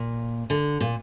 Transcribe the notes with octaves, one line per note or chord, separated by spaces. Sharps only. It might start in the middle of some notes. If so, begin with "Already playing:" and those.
Already playing: A#2
D3
A#2